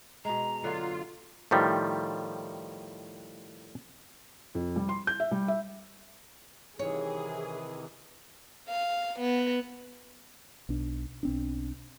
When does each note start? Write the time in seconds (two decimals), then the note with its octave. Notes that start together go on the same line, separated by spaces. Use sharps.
0.25 B2 G#3 A#5
0.64 D3 F#3 F4
1.51 A2 D#3 F3 G3
4.55 F2
4.76 G3
4.89 C6
5.07 G6
5.20 E5
5.31 G3
5.48 E5
6.79 C3 D#3 E3 G#4 C#5
8.69 F5
9.20 B3
10.69 B1 D4
11.23 B1 C4 D4